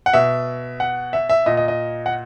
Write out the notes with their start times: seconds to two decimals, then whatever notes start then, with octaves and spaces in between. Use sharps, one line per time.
0.06 F#5
0.13 B2 E5
0.80 F#5
1.13 E5
1.30 E5
1.46 A#2 D#5
1.57 D#5
1.68 D#5
2.06 F#5